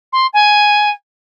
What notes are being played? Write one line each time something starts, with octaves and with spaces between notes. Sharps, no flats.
C6
G#5